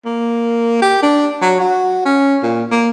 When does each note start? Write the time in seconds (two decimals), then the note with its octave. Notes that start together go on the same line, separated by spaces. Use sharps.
0.05 A#3
0.82 G4
1.02 D4
1.41 F#3
1.60 F#4
2.05 C#4
2.43 A#2
2.71 A#3